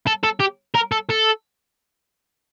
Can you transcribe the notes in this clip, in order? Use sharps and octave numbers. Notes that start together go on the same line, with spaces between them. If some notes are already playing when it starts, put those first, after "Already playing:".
A4
A4
G4
A#4
A4
A4